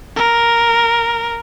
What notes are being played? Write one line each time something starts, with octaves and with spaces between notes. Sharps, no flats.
A#4